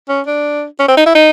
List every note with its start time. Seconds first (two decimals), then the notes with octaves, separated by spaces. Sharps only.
0.09 C#4
0.26 D4
0.79 C#4
0.88 C4
0.97 D#4
1.06 E4
1.15 D#4